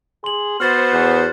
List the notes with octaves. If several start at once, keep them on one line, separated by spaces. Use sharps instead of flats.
G#4 C6 F#7
B3 F#4 C5 F6 A6
E2 F#6